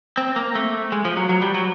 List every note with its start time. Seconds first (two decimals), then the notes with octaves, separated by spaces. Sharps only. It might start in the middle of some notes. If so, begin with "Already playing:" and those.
0.17 C4
0.36 A#3
0.55 A3
0.92 G#3
1.05 F3
1.17 F#3
1.29 F#3
1.42 G3
1.54 F#3